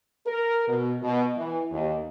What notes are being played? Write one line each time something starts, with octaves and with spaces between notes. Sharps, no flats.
A#4
B2
B2
E3
D#2